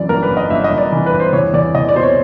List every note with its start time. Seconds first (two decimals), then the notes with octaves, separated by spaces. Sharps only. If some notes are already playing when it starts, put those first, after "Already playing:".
Already playing: F#2 E3 D5
0.09 G1 A#4
0.23 B4
0.30 G1
0.37 D#5
0.50 G1 E5
0.64 D#5
0.71 G1
0.78 D5
0.92 E3
1.06 B4
1.13 G1
1.20 C5
1.33 E2 C#5
1.54 E2 D5
1.75 E2 D#5
1.89 D5
1.95 B2 C5
2.03 C#5